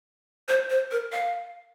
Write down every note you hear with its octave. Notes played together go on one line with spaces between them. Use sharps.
C5
C5
A#4
F5